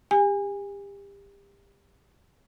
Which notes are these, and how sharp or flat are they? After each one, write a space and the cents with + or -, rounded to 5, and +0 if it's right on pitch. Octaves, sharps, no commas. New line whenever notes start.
G4 +30 G#5 -25